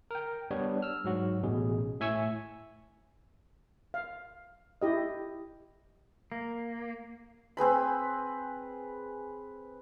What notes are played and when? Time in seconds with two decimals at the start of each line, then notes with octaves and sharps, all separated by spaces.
0.11 A#4 G5
0.51 G3 B3 D4 C#5
0.82 E6 F6
1.04 G#2 F#3 F#4
1.43 A1 B2 G#4
2.00 A2 E5 G#5 C#6 E6
3.94 F5
4.82 E4 G4 D#5
6.32 A#3
7.57 C4 G#4 B4 B5